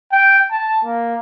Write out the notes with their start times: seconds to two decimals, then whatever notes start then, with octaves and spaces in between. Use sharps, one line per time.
0.12 G5
0.51 A5
0.85 A#3